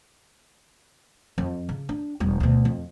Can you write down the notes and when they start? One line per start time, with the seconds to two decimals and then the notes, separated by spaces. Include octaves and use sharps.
1.38 F2
1.69 C#3
1.89 D4
2.20 E1 G3
2.40 D2 B2
2.65 F2